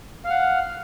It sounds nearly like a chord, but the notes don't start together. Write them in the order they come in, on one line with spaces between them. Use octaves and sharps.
F5 F6 F#5